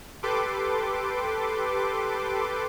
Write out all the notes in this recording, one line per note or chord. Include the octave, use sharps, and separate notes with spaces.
G4 A4 B4 C6 D6